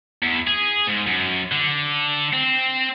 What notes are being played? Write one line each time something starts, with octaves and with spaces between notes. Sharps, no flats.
E2
G#4
G#2
F#2
D3
C4